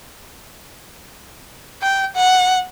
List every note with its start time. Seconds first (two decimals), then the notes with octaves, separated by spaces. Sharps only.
1.82 G5
2.16 F#5